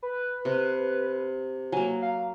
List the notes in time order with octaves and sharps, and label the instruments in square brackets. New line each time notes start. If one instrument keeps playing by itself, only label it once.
[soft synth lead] B4
[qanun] C3
[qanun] F#3 A#3 [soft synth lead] G#5
[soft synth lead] F5